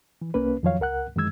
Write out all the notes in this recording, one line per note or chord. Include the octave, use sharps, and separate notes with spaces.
E3
C2 A#3 C#4 B4
F2 D#3 F3 F#3 C#5 F5
C#2 A#4 F#5 F#6
F#2 D#3 E3 G#3 E6 G#6